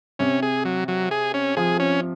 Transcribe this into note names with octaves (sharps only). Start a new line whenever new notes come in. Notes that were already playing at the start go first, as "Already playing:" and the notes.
C3 C#4
G#4
F#3
F#3
G#4
C#4
F3 G#4
C#4